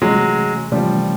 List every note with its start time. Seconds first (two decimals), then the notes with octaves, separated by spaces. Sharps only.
0.01 C3 E3 F#3 G#3 A3 C#4
0.71 C3 E3 F3 G3 A3 C#4